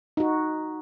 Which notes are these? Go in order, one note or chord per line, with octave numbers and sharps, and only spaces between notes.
D#4 F#4